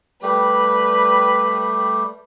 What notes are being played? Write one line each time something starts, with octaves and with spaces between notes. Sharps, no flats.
G3 A3 G4 B4